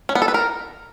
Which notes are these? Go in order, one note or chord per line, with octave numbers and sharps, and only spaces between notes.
C#4
B3
A4
B4
A#4